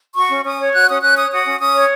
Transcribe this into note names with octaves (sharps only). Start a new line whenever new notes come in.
F#4 C#6
C#4
C#4 D#6
C#5
F#4 F#6
C#4 D#6
C#4 F#6
C#5 D#6
F#4 D#6
C#4
C#4 D#6
C#5